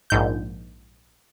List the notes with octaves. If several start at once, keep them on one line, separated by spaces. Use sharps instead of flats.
A#1 G#2 G6